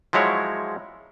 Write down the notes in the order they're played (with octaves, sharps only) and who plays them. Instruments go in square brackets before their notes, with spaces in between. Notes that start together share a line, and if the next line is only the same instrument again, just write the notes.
[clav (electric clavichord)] F3 F#3 G#3 E4 C#5